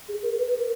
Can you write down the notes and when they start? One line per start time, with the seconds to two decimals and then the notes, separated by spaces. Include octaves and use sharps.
0.08 G#4
0.23 A#4
0.38 B4
0.49 B4
0.59 A#4